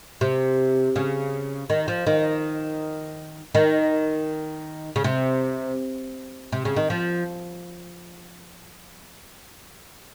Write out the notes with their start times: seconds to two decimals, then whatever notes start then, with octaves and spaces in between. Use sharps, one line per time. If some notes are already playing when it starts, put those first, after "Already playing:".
0.21 C3
0.96 C#3
1.70 D#3
1.88 F3
2.07 D#3
3.55 D#3
4.96 C#3
5.04 C3
6.52 C3
6.65 C#3
6.76 D#3
6.90 F3